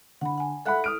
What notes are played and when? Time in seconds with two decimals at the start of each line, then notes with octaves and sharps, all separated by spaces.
0.21 D3 F#5 B5
0.38 F#5 G#5
0.66 A4 E5 F#5 B5 F#6
0.84 D#6 F6 D7